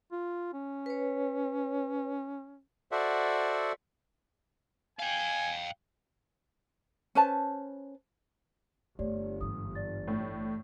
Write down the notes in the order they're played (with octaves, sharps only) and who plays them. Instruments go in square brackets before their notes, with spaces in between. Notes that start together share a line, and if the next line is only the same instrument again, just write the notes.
[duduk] F4
C#4
[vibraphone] B4 C#5
[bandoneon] F#4 A4 C5 D5 E5 F#5
[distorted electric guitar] F5 G5 [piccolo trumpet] G#5
[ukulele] C#4 B4 C5 A5
[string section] G1 [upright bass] A3 [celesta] G4 C#5 D5
[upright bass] G#1 E3 [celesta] D#6
[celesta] D5 A6
[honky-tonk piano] A2